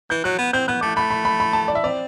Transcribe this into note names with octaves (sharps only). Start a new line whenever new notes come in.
E3 G6
F#3 F#6
B3
C4 G6
B3 F#6
A3 D6
A3 B5
B5
B5
B5
A5
D5
E5
C4 D5